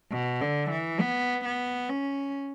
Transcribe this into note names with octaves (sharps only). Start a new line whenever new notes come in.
B2
D3
E3
B3
B3
C#4